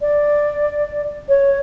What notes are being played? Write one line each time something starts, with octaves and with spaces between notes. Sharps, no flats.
D5
C#5